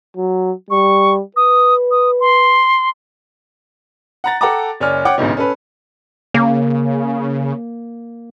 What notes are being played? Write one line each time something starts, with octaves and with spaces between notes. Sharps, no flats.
F#3
G3 C#6
B4 D#6
D#6
C6
F#5 A#5 A6
A4 F#5 G5 A5 A#5 D6
F#1 C#5 D5 G#5 F6
C#5 F#5 G5 D6
A1 D2 G#2 B2
C#4 A4 B4
C#3 A#3